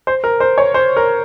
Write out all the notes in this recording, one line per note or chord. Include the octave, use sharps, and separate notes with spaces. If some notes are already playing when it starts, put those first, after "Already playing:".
C5
A#4
C5
C#5
C5
A#4